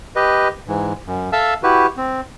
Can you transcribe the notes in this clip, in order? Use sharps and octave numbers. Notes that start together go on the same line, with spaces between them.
G4 B4 D#5
G#2 E3
F#2
A4 E5 F5 A5 E6
E4 F#4 G4 B4
C4